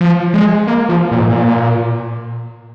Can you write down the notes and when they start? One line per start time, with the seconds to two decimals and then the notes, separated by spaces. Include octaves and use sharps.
0.01 F3
0.34 G#3
0.67 A#3
0.89 F3
1.12 A#2
1.19 G#2
1.26 A#2